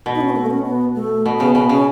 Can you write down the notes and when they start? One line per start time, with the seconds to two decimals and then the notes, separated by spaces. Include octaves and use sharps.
0.06 B2
0.15 D#4
0.21 C#4
0.29 B3
0.36 A3
0.46 B3
0.50 C#4
0.65 B3
0.95 A3
1.26 B2
1.39 C#3 B3
1.55 B2 B3
1.69 C#3 C#4